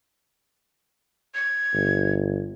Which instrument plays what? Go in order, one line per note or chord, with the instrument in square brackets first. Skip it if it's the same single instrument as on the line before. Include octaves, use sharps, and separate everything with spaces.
[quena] G#6
[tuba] G1